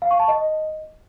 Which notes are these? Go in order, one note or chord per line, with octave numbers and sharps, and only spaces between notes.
F5
C#6
A5
D#5